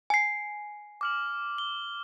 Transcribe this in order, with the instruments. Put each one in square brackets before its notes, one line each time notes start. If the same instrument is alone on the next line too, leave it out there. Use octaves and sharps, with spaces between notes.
[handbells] G#5 C7
[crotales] D6 F6 F#7
G7